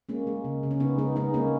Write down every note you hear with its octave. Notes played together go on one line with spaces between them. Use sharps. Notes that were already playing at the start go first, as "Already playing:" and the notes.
G#3 A#3 C#4
G#3
C#3
C#3
C#4
C#3 B3 D#4
G#3 B3 D#4
G#3 B3 D#4
G#3 A#3 C#4